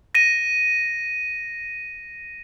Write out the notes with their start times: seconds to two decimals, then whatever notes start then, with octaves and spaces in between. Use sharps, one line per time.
0.15 A#6 D#7